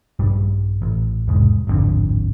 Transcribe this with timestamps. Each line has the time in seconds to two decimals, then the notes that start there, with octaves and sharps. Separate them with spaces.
0.19 A#1 G2 G3
0.82 A1
1.28 E1 C2 G#2
1.67 D1 G#1 F2 D3